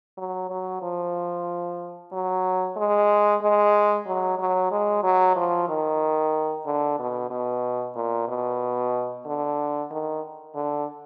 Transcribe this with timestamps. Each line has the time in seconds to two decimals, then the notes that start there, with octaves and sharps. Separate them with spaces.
0.18 F#3
0.50 F#3
0.82 F3
2.12 F#3
2.77 G#3
3.42 G#3
4.07 F#3
4.39 F#3
4.71 G#3
5.03 F#3
5.36 F3
5.69 D#3
6.66 D3
6.99 B2
7.31 B2
7.96 A#2
8.28 B2
9.26 D3
9.91 D#3
10.55 D3